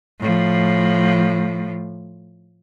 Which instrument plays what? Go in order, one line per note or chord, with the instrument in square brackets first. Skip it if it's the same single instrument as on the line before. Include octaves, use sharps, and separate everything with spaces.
[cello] A2 F3